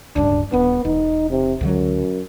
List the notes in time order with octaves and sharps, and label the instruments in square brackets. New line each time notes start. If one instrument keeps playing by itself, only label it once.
[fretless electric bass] D1 C#2 G2 [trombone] D4
[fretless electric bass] D#1 D4 [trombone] B3
[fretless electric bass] E1 [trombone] D#4
[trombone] C3
[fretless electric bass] C#2 D3 F#3 [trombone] F#2